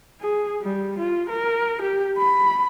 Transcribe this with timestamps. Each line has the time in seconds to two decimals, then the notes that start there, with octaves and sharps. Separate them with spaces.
0.21 G#4
0.62 G3
0.99 F4
1.29 A#4
1.82 G4
2.18 B5